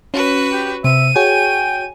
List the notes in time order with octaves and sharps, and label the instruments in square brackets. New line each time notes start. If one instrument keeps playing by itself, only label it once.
[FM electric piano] C#4 [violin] F#4 B4
[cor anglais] G4
[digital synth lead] C3 [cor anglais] E5 [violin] D#7
[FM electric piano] F#4 G#4 C#5 [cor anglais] G5 [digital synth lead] G#5